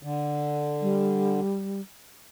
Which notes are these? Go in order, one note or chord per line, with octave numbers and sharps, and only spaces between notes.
D3
G3